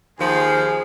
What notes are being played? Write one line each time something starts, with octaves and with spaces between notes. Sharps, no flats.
D#2 D#3 F3 G#4